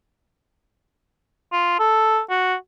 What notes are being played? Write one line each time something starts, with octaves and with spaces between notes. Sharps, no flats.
F4
A4
F#4